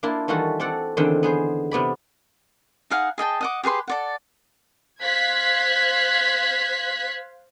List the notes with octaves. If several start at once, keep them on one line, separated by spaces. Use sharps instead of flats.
A#3 D4 E4 F4
D#3 E3 G3 F4 F#4 A4
C4 A4 D5 F#5
E2 D3 D#3 C4 E5 G5
B3 G#4 C5
C3 B3 D5 B5
D#4 G#4 F5 F#5
G#4 D#5 G5 A5
D#5 F#5 D6
G4 G#4 B4 C6
A4 D5 F#5
C5 F5 F#6 G#6 B6